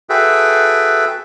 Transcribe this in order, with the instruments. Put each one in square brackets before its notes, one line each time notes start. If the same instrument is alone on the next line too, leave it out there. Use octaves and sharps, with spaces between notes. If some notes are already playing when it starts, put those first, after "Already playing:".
[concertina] F#4 G#4 A4 B4 E5 G5